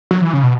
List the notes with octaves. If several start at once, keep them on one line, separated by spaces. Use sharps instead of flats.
F#3
E3
C#3
B2